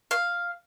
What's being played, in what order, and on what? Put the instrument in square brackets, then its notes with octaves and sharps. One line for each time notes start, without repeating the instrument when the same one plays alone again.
[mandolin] F5